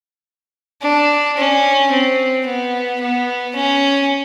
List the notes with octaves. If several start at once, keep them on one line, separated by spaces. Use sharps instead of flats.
D4
C#4
C4
B3
B3
C#4